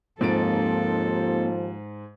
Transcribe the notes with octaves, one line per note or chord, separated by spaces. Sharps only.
D#2 G#2 F3 A#3 C4 A4 A6 D7